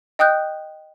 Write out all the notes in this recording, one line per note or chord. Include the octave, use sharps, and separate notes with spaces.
D#5 G5 D#6 F#6 G6